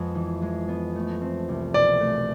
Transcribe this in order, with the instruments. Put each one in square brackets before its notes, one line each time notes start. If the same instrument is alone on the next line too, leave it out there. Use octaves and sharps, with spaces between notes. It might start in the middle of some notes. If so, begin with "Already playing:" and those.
Already playing: [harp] F2 G#3 B3
E3
G#3
B3
A3
C4
C2
[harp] B2 [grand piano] D5
[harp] A3